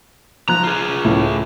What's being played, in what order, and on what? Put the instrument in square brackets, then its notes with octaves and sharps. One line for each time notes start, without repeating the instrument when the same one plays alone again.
[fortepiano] F3 F#6 [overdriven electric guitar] A#5
[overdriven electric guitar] F4 G#4
[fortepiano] C#2 A2 E4